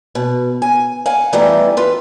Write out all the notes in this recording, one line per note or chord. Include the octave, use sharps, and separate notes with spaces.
B2
G#5
F5 F#5 G#5
E3 G3 A3 B3 D#4
F4 B4